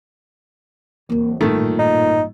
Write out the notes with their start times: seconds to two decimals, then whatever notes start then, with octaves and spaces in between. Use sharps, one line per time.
1.10 D1 E3 A#3
1.41 A1 G2 A#2 D#3 A3
1.79 D#4